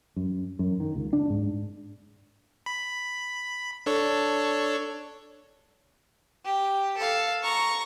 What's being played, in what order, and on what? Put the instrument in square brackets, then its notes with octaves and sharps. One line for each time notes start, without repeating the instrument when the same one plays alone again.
[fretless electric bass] F#2
F#2
D#3
C#2
D4
G#2
[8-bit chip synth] B5
D4 A4 C#5
[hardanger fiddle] G4
A4 F5
A#5 C#6